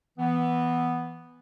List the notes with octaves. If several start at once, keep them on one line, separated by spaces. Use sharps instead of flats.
E3 B3